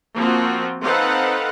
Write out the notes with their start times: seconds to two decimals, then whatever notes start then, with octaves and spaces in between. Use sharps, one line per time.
0.16 F3 A#3 C4 F4 F#4
0.83 C4 D#4 A4 B4 F5 F#5